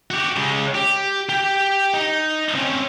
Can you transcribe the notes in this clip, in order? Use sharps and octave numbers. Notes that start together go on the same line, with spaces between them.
F#4 G4
C#3 G#3
G4
G4 G5
D#4
C4 C#4